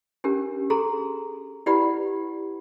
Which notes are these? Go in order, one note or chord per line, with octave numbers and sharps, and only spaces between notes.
C#4 D4 G4 A#4
G#4 A4 A#5 C6
E4 G4 B4 D5 F#5 B5